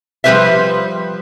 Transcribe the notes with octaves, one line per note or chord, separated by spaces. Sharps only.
F3 G3 D4 B4 C5 E5